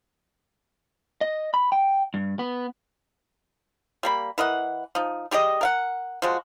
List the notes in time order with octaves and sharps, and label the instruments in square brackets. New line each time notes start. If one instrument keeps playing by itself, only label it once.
[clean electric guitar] D#5
B5
G5
G2
B3
[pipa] G3 A#3 B5
E3 A#4 D#5 F#5
F3 D#4
G3 G4 G#4 D#5
A#4 F5 F#5
F3 G#3 F#4